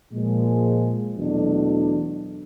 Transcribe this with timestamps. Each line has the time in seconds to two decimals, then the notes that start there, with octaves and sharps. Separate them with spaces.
0.13 A#2 F3 G#3
1.16 E2 B2 F#3 A3 D4